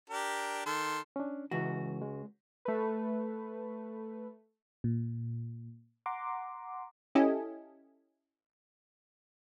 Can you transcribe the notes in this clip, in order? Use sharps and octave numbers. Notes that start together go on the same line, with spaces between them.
D4 G4 A#4
D#3 A4 C6
C#4 D4
C#2 E3 F#4
G#3
A3 B4
A#2
F#5 A#5 C6 D6
C#4 E4 G4 A4 D#5 G#5